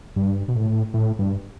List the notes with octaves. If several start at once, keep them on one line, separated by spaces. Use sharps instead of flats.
G2
B2
A2
A2
G2